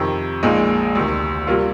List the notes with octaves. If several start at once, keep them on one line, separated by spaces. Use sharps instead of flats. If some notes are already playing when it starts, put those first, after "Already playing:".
Already playing: F2 C3 D#3
A#1 A#2 F3 G#3 D#4
D2 C3 D#3
C3 G3 A#3 F4